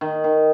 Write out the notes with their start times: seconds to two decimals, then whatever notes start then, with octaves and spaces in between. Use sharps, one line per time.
0.01 D#3
0.24 D#3